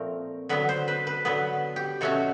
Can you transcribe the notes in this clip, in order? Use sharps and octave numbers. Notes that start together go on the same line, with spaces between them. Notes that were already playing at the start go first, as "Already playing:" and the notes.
Already playing: A#2 F3 A3 C4 A#4
D3 F#3 B3 B4
C5
B4
B4
D3 F#3 B3 B4
G4
B2 F#3 A3 C#4 F#4